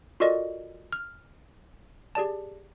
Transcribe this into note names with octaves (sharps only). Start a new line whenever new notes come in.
F4 F#4 A4 A#4 D5 D#5
F6
G4 G#4 D5 A5